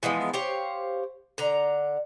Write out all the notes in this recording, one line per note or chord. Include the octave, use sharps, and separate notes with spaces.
E3 F3 G#3 B3
G4 C5 C#5 F5
D3 A#5